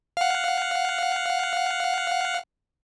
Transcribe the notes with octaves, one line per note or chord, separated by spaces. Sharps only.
F5 F#5